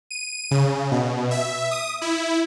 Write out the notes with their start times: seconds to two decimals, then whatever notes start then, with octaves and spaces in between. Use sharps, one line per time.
0.11 D#7
0.51 C#3
0.92 B2
1.31 E5
1.71 D#6
2.02 E4